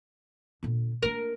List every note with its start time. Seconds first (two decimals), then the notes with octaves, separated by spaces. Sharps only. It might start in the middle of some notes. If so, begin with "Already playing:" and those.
0.63 A#2 D3
1.03 A#3 D4 A#4